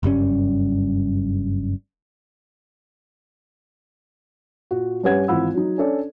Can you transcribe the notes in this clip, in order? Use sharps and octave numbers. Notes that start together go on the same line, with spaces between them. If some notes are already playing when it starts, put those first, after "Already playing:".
F#1 G2 G3 C#4
A#2 F#4
G2 C#4 G4 B4 F#5 G#6
G#1 E3 F4 F#5 B5 E6
F#3 D#4
C#4 D4 A4 D5